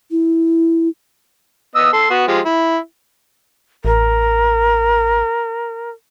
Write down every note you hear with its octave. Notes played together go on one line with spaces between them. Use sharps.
E4
B3 D#5 E6
A4 C6
B3 F#4
F3 G#3 G4
E4
A1 A#4